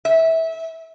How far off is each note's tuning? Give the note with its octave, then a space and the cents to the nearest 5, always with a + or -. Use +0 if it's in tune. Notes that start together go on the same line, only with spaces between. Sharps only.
E5 -20